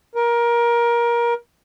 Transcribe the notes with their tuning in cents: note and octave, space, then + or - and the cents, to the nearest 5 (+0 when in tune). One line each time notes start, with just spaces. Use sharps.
A#4 +20